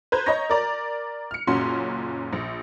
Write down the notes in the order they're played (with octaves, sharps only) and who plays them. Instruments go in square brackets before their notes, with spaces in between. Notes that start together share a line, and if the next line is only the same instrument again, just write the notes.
[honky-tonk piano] B4 C5 A#5 G6 G#6
C#5 D#5 A#5 C#6 G6 A#6
A#4 D5 A#5
F6 C#7
F#1 A#2 C#4 F#4 C6
A#1